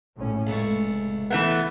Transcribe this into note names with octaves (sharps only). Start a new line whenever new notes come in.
A#1 A2 C#4
F1 C#2 A3 C#6
E3 A3 B3